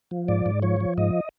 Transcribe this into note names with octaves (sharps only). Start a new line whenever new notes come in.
F3
G#2 D5
G#2
F3 C#5
F3
G#2 D#5